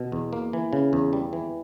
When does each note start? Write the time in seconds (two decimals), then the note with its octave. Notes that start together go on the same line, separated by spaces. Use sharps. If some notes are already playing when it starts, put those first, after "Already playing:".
Already playing: B2
0.12 E2
0.33 A#3
0.53 E3
0.73 C#3
0.93 E2
1.13 G3
1.33 E3